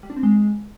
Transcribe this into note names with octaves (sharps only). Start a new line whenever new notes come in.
G3
D4
C4
G#3